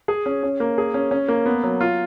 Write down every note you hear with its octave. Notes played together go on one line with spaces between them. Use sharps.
G#4
C#4
C#4
A#3
G#4
C#4
C#4
A#3
B3
F#3
F4